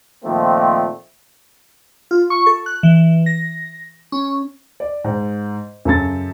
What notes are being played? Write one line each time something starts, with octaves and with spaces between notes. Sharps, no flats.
A#2 D#3 F3 A3 A#3 C4
F4
C#6
A4
F#6
E3
A#6
C#4
D5
G#2
F#2 C#3 A4 A6